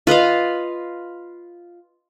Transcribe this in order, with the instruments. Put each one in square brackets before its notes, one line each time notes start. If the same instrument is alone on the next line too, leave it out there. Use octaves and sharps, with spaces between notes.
[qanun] F4 B4 D#5 F5